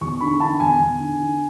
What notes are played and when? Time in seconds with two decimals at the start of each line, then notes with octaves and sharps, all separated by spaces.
0.01 E2 C#6
0.21 D3 B5
0.40 D3 A5
0.60 E2 G#5
0.79 E2
0.99 D3
1.19 D3